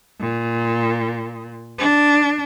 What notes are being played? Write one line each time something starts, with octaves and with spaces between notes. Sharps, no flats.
A#2
D4